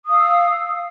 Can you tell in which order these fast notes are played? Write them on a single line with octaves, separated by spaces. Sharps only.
D#6 F5 E6